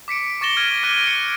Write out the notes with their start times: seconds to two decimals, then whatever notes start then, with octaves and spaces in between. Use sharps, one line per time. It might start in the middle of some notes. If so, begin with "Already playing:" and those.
0.08 D6 B6 C#7 D7
0.41 C#6 D6 A6 A#6 E7 G7
0.57 F6 G#6 D#7 E7
0.83 D6 F#6 A#6 D7 D#7
1.07 C#7